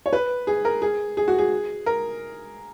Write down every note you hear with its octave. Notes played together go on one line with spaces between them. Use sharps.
C#5
B4
G#4
A#4
G#4
G#4
F#4
G#4
A#4